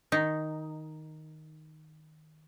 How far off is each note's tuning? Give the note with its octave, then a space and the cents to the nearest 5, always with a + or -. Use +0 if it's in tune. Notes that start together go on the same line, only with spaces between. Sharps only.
D#3 +0 D#4 +0